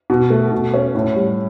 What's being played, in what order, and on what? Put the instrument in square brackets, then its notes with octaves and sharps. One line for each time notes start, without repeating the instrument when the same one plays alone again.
[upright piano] B2
A3
B2
C#4
A2
G3